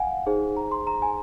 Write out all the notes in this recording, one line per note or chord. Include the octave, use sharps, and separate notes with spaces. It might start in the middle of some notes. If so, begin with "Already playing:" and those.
Already playing: F5 F#5 G#5
D#4 G#4 C5
A#5
C6
A#5
G#5